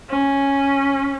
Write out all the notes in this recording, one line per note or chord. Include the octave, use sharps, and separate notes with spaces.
C#4